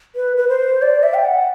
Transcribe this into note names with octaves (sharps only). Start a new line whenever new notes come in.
B4
B4
C5
D5
E5
G5
F#5